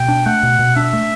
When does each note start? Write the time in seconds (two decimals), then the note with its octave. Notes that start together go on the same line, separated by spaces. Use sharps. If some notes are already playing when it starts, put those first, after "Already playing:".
Already playing: B2 G5
0.08 D4
0.26 A3 F#5
0.43 B2
0.59 B2
0.76 D4 E5
0.93 A3